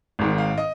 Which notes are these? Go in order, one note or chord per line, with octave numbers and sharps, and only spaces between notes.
G#1 G#2 D#3
F5
D#5